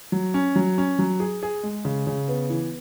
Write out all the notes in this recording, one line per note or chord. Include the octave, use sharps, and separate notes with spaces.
F#3
C#4
F#3
C#4
F#3
G#4
G#4
G#3
C#3
C#3
B3
E3